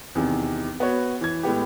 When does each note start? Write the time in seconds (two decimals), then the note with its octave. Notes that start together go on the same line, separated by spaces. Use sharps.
0.15 E2 C3 D#3
0.80 B3 F#4 C#5
1.21 E3 G#6
1.43 A2 G#3 B3 G4